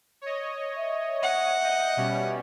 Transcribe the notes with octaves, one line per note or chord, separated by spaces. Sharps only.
C#5 D#5
E5
F#5
D#5 G6
B2 G3 C#4